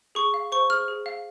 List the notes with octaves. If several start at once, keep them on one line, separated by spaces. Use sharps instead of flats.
G#4 C#6
F5
C5 C#6
G#4 F6
G#4
F5